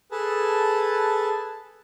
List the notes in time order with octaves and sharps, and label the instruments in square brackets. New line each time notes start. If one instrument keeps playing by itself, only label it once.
[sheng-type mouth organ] G#4 A4 B4 A5